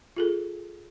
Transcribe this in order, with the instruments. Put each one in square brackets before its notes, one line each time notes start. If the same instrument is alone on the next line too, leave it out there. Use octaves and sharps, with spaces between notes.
[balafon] F4 G#4 A4